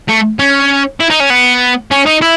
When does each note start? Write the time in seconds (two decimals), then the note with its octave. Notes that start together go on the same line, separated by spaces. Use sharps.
0.09 A3
0.39 C#4
1.00 E4
1.10 D#4
1.20 C#4
1.30 B3
1.91 C#4
2.06 D#4
2.22 E4